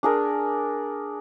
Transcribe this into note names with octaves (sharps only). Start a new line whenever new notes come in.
D4 G#4 A#4